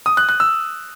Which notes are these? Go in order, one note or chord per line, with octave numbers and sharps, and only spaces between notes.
D#6
F#6
F#6
E6